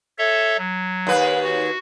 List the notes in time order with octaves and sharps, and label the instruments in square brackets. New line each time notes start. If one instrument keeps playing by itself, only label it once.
[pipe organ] A4 C#5 E5
F#3
[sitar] D#2 B4
[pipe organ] F#4